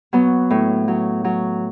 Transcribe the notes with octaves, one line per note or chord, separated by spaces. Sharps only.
F#3 B3
A2
F#3
F#3